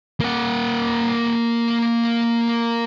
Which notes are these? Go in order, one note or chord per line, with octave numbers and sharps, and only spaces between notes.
A#3 F#5